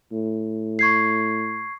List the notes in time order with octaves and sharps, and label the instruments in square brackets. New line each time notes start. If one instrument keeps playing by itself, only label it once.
[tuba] A2
[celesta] C#6 G#6 C7